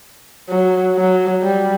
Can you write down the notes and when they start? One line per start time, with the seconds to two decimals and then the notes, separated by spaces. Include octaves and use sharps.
0.49 F#3
0.96 F#3
1.43 G3